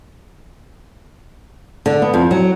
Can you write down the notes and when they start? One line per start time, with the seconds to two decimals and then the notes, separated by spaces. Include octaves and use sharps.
1.86 D3
2.02 B3
2.14 F2
2.31 F#3